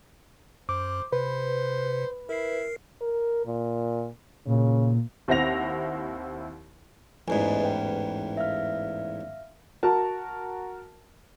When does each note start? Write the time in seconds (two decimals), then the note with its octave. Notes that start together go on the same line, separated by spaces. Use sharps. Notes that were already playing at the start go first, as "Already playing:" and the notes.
0.69 F#2 C5 D6
1.12 C3 B4 C5
2.29 E4 A#4 C7
3.01 A#4
3.46 A#2
4.47 A#2 C#3
5.28 D#2 C4 E4 F#5 A#6 F7
7.28 A1 E2 G#2 D#5 G#5
7.61 B4 G5
8.37 E5 F5 F6
9.83 F#4 A#4 A5